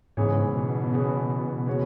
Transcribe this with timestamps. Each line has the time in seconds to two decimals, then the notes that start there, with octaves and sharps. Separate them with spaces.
0.17 G#2 C#3 E3 B3 G#4 C#5
0.54 B2
0.92 C#3 E3 B3 G#4 C#5
1.67 C#3 G#3 B3 F#4 C#5